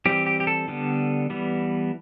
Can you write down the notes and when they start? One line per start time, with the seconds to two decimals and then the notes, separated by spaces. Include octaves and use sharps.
0.06 E3 G3 C4 G4
0.26 G4
0.40 G4
0.47 A4
0.68 D3 G3 B3
1.30 E3 G3 B3